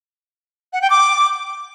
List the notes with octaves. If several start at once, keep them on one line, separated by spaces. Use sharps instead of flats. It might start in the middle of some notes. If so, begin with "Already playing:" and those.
F#5
G5
D6